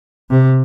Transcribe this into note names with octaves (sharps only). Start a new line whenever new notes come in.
C3